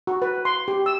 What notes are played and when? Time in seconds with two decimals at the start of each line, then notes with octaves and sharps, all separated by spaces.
0.07 F#4
0.22 B4
0.45 C6
0.68 G4
0.86 E6